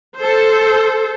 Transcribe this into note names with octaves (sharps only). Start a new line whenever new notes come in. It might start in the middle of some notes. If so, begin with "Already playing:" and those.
A4 C5